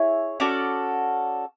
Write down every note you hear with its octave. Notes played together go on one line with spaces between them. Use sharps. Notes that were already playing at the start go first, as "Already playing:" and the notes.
Already playing: E4 G#4 C#5
C#4 F#4 A4 D5